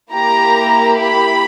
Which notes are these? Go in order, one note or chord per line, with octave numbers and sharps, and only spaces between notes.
A#3 E4 G4 A#5
B5